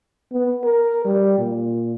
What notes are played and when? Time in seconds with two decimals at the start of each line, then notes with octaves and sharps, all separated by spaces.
0.32 B3
0.64 A#4
1.05 G3
1.39 A#2